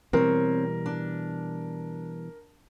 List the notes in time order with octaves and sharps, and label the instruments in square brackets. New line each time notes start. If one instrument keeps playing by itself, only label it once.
[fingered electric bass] B2 E3 G3 [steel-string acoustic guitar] C4 C#5 [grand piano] A#4
[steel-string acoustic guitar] D4